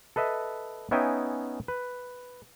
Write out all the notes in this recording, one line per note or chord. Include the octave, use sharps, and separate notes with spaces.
A4 B4 D#5 E5
B3 C#4 D#4 E5 G5 G#5
B4